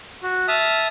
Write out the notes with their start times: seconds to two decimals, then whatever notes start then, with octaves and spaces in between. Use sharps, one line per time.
0.23 F#4
0.48 E5 A5 D#6 F6